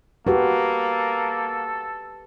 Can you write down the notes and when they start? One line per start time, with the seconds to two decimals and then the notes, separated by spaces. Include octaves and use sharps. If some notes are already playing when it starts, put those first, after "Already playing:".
0.27 A#3 F#4 G4 A4 B4